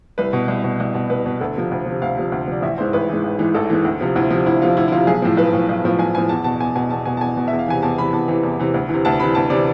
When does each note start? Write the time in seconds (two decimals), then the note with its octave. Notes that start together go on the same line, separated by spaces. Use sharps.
0.18 C2 B4
0.33 B2
0.48 C2
0.64 B2
0.80 C2
0.94 B2
1.10 C2 B4
1.26 B2
1.41 D2 A4
1.56 C3 F3
1.71 D2
1.86 C3 F3
2.02 D2 F5
2.17 C3 F3
2.32 D2
2.48 C3 F3 D5
2.62 A1 E5
2.78 G#2 E3 C5
2.93 A1 B4
3.09 G#2 E3
3.24 A1
3.39 G#2 E3
3.54 A1 A4
3.70 G#2 E3
3.85 D2
4.01 C3 F3
4.16 D2 E4
4.30 C3 F3
4.46 D2 E4
4.61 C3 F3 F4
4.77 D2 E4
4.88 E4
4.92 C3 F3 F4
5.07 B1 G#4
5.22 A2 F3
5.37 B1 B4
5.53 A2 F3
5.69 B1
5.84 A2 F3
5.99 B1 G#5
6.15 A2 F3 G#5
6.29 E2 A5
6.44 B2 A5
6.60 E2 G#5
6.76 B2 G#5
6.90 E2 A5
7.05 B2 G#5
7.17 A5
7.21 E2 G#5
7.37 B2
7.48 E2 E5
7.59 F5
7.68 C3 E3 G#5
7.82 E2 A5
7.98 C3 E3 B5
8.13 E2 A5
8.28 C3 E3
8.43 E2
8.59 C3 E3
8.74 D2
8.89 C3 E3
9.05 D2 A5
9.20 C3 E3 B5
9.35 D2 A5
9.50 C3 E3 D5